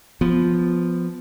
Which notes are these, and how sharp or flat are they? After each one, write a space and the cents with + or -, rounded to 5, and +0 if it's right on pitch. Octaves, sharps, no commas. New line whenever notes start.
F3 +0 B3 +15